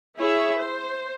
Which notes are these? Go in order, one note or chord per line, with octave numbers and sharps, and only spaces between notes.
E4 G#4 C#5 E5
C5